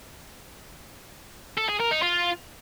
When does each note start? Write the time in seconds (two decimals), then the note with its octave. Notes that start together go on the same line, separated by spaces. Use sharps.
1.57 A4
1.69 G#4
1.80 A#4
1.91 D#4
2.02 F4